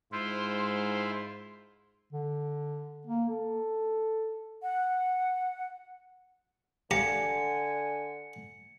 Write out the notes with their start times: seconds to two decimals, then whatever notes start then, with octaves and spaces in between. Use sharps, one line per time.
0.12 G#2 E4 F4 C5 C6
2.13 D3
3.07 A#3
3.29 A4
4.62 F#5
6.91 D3 G4 F5 G#5 A#5 C#7